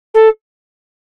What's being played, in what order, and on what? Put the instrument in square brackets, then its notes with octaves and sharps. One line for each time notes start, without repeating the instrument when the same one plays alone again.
[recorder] A4